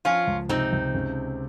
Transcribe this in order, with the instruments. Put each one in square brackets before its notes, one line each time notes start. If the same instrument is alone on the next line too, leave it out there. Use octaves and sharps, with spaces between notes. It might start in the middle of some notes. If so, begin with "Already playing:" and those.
[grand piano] F3 [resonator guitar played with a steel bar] C#4 F4
[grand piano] C#2
[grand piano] C3 [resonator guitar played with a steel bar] C4 D#4
[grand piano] C#2
C#3